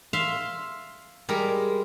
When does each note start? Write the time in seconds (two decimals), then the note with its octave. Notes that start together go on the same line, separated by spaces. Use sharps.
0.13 E5 F5 C6
1.29 G3 G#3 A#4